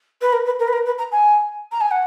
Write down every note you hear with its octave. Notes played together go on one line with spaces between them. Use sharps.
B4
A#4
B4
A#4
B4
A#4
B4
A#5
G#5
A#5
G#5
F#5